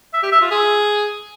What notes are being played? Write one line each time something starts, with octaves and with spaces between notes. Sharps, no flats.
E5
G4
E5
F4
G#4